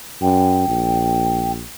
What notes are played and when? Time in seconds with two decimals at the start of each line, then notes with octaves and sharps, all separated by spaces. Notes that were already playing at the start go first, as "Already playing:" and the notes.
0.22 F#2 G5
0.68 A#1